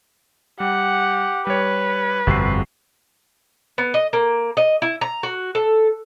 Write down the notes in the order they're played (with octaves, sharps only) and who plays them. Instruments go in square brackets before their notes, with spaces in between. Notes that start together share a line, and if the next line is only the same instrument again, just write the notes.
[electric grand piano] G3 [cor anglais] G4 [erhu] F#5
[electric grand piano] G3 C#5 [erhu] B4
[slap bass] G1 F2 [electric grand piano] C3 C7 [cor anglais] F#4
[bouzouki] B3
D#5
A#3
D#5
E4
A#5
F#4
A4